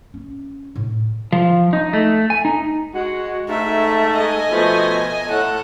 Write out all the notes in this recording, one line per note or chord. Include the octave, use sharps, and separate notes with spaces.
C#4
A2
F3
D#4
A3
G#5
D#4
G#3 F#4
G#2 A3 E5
D#5 G#5
B2 F3 A3
A2 A4 F#5